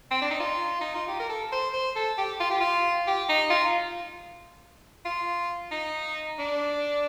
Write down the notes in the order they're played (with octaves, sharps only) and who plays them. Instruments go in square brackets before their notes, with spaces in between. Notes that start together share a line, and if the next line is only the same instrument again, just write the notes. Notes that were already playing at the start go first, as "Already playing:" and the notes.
[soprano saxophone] C4
D4
D#4
F4
D#4
F4
G4
A#4
A4
C5
C5
A4
G4
F4
G4
F4
G4
D#4
F4
F4
D#4
D4